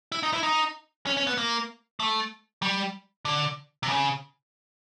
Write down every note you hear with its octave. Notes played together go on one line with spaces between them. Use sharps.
E4
D#4
E4
D#4
C#4
C#4
B3
A#3
A3
G3
D3
C3
C#3